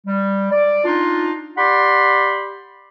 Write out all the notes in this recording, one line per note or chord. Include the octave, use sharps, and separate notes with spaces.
G3
D5
D4 D#4 F4
G4 D5 F#5 B5 C6